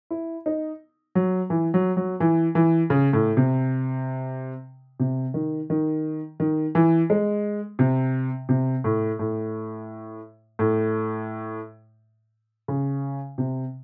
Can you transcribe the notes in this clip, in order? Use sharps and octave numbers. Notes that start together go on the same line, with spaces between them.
E4
D#4
F#3
E3
F#3
F#3
E3
E3
C#3
A2
C3
C3
D#3
D#3
D#3
E3
G#3
C3
C3
A2
A2
A2
C#3
C3